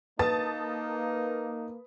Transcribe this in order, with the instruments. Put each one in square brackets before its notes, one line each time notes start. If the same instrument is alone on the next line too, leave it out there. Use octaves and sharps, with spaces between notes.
[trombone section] A#3 [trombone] D#4 [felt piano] B4 [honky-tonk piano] A5 D#6 A6